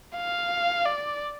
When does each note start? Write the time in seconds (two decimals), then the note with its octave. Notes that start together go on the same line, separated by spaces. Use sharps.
0.18 F5
0.85 D5